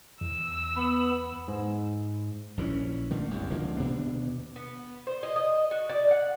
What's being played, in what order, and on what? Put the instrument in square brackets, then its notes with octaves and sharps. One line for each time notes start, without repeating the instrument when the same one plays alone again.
[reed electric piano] E2 [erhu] E6
[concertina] B3 [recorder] B5
[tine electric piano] G#2
[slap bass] A#1 E3 F3 C#4
D3 A3 A#3
G1 C2 F#2
C#2 D3 F3 A#3
D#2 B2 B3 D4
[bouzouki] B3
C5
D#5
D#5
F#4
D5
F#5